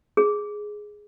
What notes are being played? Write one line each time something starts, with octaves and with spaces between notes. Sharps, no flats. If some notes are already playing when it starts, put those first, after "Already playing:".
G#4